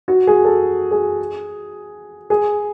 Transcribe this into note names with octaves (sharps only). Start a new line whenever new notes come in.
F#4
G#4
A4
G#4
G#4